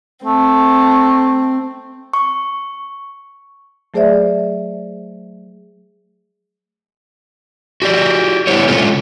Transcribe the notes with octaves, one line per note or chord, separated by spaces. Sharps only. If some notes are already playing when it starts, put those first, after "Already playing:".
A3 C4
C#6
F#3 A3 G#4 C5 D5 E5
F#4 G4 D5
G3 B3 E4 C5 C#5
C3 G#3 C#4 F4 A4